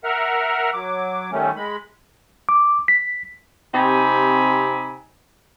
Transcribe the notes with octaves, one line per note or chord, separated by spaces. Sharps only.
A#4 E5 F#5 F6
F#3 D6
D#3 G3 A3 C#4
G#3 B5
D6
B6
C3 C4 D#4 G4 G#5 B5